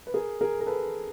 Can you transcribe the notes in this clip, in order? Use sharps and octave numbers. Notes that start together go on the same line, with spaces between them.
B4
G#4 A#4
G#4 A#4
A#4
A4 B4